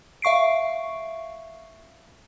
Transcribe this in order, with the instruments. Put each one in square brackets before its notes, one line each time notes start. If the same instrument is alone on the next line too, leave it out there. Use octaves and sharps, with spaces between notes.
[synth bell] E5 F5 C#6 C7 D7